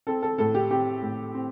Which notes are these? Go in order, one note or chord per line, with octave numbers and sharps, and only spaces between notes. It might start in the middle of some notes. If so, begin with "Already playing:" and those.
C4 A4
A4
A2 A4
G4
C4 G4
A2
C4